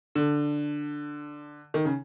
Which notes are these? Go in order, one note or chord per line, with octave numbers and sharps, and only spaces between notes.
D3
D#3
C#3